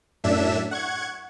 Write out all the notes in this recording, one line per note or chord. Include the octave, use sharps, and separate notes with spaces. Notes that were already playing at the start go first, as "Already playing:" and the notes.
F#2 A2 D4 E5 E7
F#5 C#6 G#6